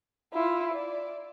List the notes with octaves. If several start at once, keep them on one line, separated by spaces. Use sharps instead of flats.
E4 F4
D5